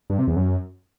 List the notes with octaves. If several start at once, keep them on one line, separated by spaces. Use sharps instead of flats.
G2
C3
E2
F#2